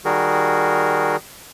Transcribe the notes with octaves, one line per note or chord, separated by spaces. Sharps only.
D#3 G3 F#4 G#4 A#4